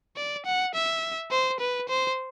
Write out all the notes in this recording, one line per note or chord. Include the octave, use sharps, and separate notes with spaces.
D5
F#5
E5
C5
B4
C5